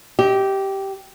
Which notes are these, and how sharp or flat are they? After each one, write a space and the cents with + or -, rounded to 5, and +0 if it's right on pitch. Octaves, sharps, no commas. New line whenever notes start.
G4 -10 D#5 +35